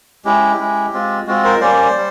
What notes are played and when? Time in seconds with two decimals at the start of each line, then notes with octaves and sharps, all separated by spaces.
0.25 G#3 C#4 E4 G4
0.59 G#3 C#4 E4
0.93 G#3 C4 F4
1.27 G#3 C4 F4 F#4
1.44 A#4 C5
1.61 G3 A#3 C#4 C5 D5
1.95 G3